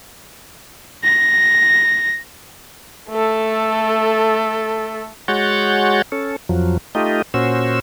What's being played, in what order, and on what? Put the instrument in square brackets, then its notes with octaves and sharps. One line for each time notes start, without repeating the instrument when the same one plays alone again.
[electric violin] A#6
[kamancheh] A3 A4
[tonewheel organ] G#3 F#4 C#5 F#5 G6 A6
C#4 A4
F2 F3 F#3
A3 D#4 F4 G4 D#5
A#2 C#4 F#4 C5 E6